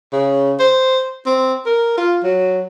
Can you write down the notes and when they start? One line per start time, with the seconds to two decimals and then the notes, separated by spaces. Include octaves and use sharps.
0.13 C#3
0.59 C5
1.26 C4
1.66 A#4
1.97 F4
2.23 F#3